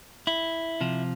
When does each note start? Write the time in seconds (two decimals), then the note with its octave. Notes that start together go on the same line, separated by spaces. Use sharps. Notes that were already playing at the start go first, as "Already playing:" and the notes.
0.27 E4
0.81 C3 F3